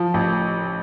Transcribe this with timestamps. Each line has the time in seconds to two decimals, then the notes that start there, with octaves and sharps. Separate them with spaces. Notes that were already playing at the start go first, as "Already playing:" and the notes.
Already playing: F3
0.14 A1